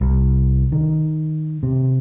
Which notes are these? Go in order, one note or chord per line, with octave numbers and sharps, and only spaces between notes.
C2
D#3
C3